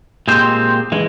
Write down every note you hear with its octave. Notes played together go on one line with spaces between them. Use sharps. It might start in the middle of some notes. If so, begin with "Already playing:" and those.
A#2 G#3 C4 G4 C5
E3 G#3